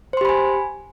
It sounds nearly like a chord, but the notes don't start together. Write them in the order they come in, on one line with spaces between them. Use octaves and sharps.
C5 C6 G4 B5 G#5